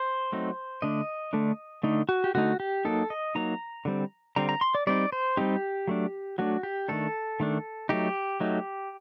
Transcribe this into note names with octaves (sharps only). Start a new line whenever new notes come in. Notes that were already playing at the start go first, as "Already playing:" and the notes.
Already playing: C5
F#3 A3 C4 D#4
D3 A3 D4 D#5
D3 A3 D4
D3 A3 D#4
F#4
G4
D3 A3 D#4 F#4
G4
F#3 A#3 D#4 A4
D#5
F#3 A#3 D#4 A#5
D3 G3 C4
D3 G3 C4 A#5
A#5
C6
D5
G3 C4 D#4 D5
C5
G3 C4 D#4 G4
F#3 A3 D4
F#3 A3 D4 F#4
G4
D#3 A3 D4 A4
D#3 A3 D4
F#3 A3 D#4 G4
F#3 A3 D#4